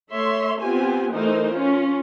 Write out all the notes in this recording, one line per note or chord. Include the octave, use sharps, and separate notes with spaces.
A3 C#5 E5 C6
B3 C4 F4 G4 G#5
E3 A3 D#4 A#4 C5
C#4 F4